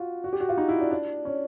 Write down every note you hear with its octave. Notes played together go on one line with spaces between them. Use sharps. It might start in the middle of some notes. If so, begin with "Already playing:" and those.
Already playing: F4 F#4
F#4
G4
F#4
F4
D#4
E4
D4
D4
C#4